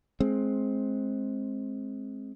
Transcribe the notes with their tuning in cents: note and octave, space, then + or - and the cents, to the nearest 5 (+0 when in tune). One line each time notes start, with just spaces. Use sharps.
G#3 +20 C4 +15